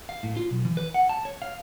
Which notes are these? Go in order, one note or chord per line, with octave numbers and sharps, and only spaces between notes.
F5
A2
F4
B1
E3
B4
F#5
A5
C#5
F5